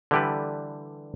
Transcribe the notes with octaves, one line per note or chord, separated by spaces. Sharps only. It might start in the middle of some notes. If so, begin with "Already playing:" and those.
D3 E3 G3 G4 A4 B4